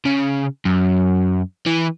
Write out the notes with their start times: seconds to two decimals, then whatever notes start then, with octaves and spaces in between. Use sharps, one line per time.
0.05 C#3
0.65 F#2
1.66 E3